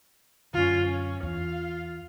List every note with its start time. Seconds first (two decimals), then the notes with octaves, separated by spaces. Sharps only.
0.54 F#2 D3 C#4 F4
0.82 C#4
1.23 E2 F4 F5